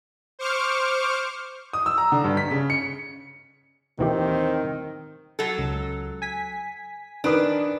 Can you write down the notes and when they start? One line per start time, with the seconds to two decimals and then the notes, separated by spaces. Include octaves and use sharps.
0.39 C5 C#6 D6 F6
1.73 D#6
1.86 E6
1.98 A#5
2.12 D3
2.24 G2
2.37 B6
2.51 C#3
2.70 C#7
3.99 D#2 D#3 E3 C4 G4
5.39 F#3 A4
5.58 C#2
6.22 G#5 B6
7.24 D#3 D4 B4 D#6